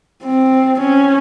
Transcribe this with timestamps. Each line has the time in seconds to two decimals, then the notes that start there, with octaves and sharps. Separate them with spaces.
0.23 C4
0.81 C#4